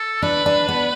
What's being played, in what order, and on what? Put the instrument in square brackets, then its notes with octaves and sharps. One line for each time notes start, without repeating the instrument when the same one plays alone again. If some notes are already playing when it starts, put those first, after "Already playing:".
Already playing: [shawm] A4
[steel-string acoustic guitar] D4 [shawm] B4
[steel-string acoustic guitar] D4
B3